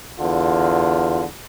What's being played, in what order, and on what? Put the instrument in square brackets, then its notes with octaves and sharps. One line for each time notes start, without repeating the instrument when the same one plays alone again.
[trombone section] E2 D3 F4